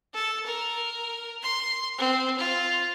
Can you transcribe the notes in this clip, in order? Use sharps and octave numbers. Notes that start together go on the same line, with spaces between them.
A4
A#4
C6
C4
F4